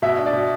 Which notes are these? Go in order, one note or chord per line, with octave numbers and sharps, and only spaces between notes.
B2 E5
D4
D5
B2